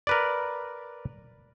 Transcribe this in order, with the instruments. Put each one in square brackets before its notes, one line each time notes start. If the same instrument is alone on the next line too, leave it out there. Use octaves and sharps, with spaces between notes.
[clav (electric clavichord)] A#4 B4 D5